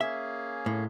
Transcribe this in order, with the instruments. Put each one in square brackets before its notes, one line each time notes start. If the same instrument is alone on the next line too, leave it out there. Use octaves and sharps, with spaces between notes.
[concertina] A#3 C#4 G#4 [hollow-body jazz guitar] E5
[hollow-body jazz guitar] A2